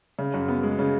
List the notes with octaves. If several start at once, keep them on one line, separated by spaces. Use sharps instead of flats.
C#3
F#2
B3
G#3
C#3